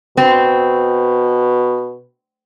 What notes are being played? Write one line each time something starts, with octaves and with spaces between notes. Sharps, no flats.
B2 C4